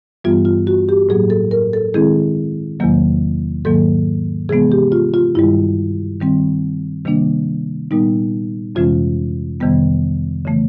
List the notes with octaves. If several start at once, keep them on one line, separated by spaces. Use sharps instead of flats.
G2 E3 G3 B3 F4
F4
F#4
G4
A2 F#3 A#3 G#4
A4
A#4
A4
D#3 G#3 C4 E4 G#4
E2 C3 D#3 F#3 A#3
G#2 D#3 F#3 A#3 A4
C3 E3 G#3 B3 G#4
G4
F4
F4
G2 D#3 G3 E4
D#3 G3 C4
C3 D#3 G3 A#3 D4
A#2 G3 B3 D#4
F2 C3 E3 G#3 C#4 F4
F2 C3 D#3 G3 B3
C#3 E3 A3